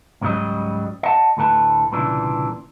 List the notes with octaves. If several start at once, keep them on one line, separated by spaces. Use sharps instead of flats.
C#2 G#2 C#3 F#3 G3 D#5
D#5 F#5 A5
D2 A2 A4 B4 A5
C2 A#2 C#3 E3 D4